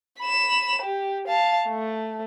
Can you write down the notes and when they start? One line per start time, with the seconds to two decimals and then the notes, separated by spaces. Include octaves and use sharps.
0.20 B5 E7
0.82 G4
1.27 F5 A5
1.68 A3